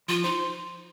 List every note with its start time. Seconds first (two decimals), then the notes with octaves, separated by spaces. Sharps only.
0.08 F3 F4
0.24 D#4 C5